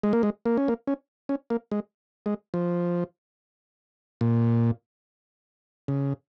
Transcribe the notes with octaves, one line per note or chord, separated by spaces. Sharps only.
G#3
A#3
G#3
A#3
C#4
A#3
C#4
C#4
A#3
G#3
G#3
F3
A#2
C#3